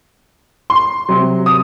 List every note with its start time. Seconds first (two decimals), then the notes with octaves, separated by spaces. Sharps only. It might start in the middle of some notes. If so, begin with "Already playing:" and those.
0.70 C6
1.09 C3 F#3
1.46 D#6